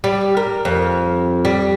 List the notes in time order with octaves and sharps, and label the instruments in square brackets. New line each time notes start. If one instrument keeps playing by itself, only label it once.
[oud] G3
A#4
F2
G3